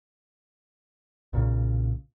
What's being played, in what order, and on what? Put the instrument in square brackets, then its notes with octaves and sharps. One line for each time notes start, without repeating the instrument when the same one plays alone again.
[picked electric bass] B1 A#2 C#3